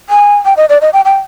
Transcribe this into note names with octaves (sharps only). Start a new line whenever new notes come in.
G#5
G5
D#5
D5
D#5
G5
G5